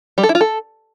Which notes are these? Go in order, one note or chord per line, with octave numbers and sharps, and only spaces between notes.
G3
A4
E4
F4
A4